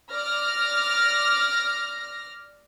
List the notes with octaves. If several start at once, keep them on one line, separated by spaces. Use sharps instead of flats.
D5 F6 A#6